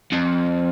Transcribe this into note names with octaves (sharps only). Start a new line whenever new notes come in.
F2